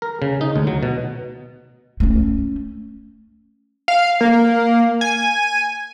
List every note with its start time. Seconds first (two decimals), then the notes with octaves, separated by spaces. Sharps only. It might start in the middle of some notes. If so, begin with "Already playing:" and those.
0.02 A#4
0.22 C#3
0.41 D#4
0.56 D2
0.67 F#3
0.83 B2
2.00 A3 C#4
3.88 F5
4.21 A#3
5.01 G#5